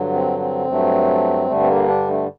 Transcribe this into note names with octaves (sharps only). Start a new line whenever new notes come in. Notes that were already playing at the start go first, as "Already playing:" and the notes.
Already playing: G2 D3 F#3
C4
C4
G2 F#3 A3
G2 D3 G3 A3
C4
A#3
D4
A3